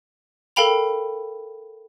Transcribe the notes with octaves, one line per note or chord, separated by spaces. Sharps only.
A4 A#4 F5 G5 B5 F7